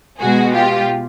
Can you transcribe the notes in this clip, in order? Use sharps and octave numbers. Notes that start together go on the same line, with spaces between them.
B2 G#3 F#4 G#4
F4 G4